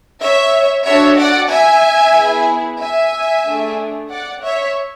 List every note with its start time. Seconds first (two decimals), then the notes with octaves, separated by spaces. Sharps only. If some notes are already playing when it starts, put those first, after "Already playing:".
0.21 C#5 E5
0.85 D4 F#4 A4 C#5 E5
1.18 D5 F#5
1.51 E5 G#5
2.16 B3 E4 G#4
2.80 E5 G#5
3.45 A3 D4 G#4
4.10 D5 F#5
4.43 C#5 E5